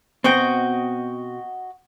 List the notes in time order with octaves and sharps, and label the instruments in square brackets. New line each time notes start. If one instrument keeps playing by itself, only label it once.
[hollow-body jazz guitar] B2 C4 [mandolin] F#4 D#5 G5